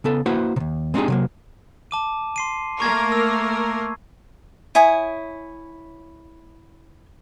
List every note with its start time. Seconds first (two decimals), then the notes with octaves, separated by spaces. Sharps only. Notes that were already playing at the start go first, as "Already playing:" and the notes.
0.04 C#3 B3 A4
0.26 A#3 E4 F#4 B4 C5 F#5
0.56 D#2 C3
0.94 G#3 C4 D4 D#4 G4 G#4
1.08 C3 F#3 A#3
1.91 A5 D6 D#7
2.36 C6 C7 D#7
2.80 A3 A#3 A#4 C#6 G#6
3.12 E6
4.75 E4 C#5 G#5 D#6